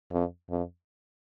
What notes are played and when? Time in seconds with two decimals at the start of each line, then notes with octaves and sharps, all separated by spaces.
0.12 F2
0.50 F2